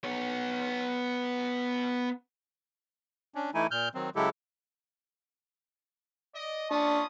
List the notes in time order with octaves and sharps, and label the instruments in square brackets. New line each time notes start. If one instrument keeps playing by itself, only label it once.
[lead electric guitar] B3 C#5
[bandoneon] C#4 D4
E3 A3 D#4 E4 G#5
A#2 F6 G6
D#3 F#3 C4
C#3 F#3 G#3 E4 G4 A4
[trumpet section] D5 D#5
[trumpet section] C#4 F4 D#6 [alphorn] D4 [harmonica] A5 C#6